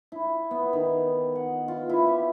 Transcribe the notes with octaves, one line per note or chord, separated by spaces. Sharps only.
E4
B3
D#3
F#5
F4
E4
G4